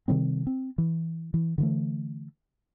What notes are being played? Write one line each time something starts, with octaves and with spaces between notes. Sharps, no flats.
C3 D#3 G3 C4
C4
E3
E3
D3 E3 A3